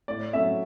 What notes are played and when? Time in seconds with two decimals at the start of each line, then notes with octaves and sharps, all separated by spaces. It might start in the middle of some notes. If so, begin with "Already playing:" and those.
0.08 A2 D5
0.33 F#3 A3 C#4 E5